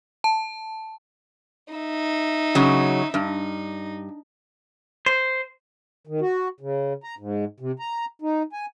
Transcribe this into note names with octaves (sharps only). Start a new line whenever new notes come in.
A5
D#4 E5
C#3 F#3
G2 D#4
C5
D#3
F#4
C#3
A#5
G#2
C3
A#5
D#4
G#5